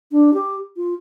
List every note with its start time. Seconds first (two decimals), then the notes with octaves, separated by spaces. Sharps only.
0.12 D4
0.34 G4
0.77 F4